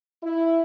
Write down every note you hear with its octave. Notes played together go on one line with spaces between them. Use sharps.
E4